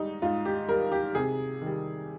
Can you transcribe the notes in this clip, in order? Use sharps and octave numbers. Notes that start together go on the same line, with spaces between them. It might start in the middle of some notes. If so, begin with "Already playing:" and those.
Already playing: G#2 G3 D#4
G#2 F4
G4
G3 A#4
G4
C3 G#4
D#3 G3